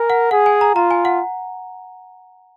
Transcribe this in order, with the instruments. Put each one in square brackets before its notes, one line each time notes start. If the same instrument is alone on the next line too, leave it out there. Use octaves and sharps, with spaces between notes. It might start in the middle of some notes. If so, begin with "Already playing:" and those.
Already playing: [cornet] A#4 [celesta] G#5
[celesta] F#5
[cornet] G#4 [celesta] F#5
[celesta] G#5
A#5
[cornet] F4 [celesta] A#5
[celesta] G#5
F#5